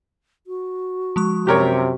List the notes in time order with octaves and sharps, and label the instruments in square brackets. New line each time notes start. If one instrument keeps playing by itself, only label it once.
[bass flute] F#4
[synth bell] F3 G#3 C#6
[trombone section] F#2 C3 [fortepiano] G4 A#4 C#5